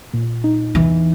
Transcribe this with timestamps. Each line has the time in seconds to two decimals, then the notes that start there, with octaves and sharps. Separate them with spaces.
0.13 A#2
0.44 D#4
0.74 E2 E3